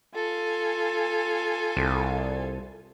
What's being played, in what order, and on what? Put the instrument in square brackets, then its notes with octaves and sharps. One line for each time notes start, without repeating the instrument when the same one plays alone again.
[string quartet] F4 A4 G#5
[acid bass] C2